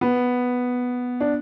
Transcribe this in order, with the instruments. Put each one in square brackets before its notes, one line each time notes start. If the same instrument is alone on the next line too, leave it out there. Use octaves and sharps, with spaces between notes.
[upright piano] B3
D4